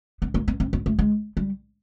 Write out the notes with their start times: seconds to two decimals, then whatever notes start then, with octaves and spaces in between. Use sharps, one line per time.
0.22 B3
0.34 A#3
0.48 B3
0.60 C4
0.73 B3
0.86 A3
0.99 G#3
1.37 G3